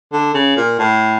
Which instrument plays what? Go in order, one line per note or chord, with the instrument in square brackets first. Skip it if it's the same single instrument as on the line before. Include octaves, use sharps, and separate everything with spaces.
[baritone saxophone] D3
C#3
A#2
A2